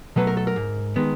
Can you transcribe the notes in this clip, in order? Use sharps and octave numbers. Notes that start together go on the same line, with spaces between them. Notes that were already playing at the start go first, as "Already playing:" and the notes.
B2 F#3 A3 B4
A#4
A4
A#4
G#2
D#3 G#3 B3